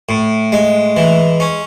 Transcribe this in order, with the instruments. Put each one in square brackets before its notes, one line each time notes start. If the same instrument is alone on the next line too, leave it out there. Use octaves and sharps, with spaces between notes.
[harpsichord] A2
G#3
E3
C#4